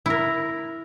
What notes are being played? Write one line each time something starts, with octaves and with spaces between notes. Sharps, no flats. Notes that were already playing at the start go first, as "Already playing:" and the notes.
E4 A#4